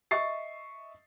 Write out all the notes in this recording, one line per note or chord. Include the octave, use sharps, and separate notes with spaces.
D#5 E5 C#6 A6 C7